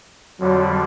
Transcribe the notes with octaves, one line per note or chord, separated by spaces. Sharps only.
F2 D3 F#3 G3